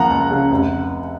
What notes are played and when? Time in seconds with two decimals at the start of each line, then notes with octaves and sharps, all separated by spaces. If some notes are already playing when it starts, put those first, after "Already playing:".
Already playing: C#2 C#3 F3 A#3 F#5 A#5
0.10 C#2
0.31 C#3
0.51 F1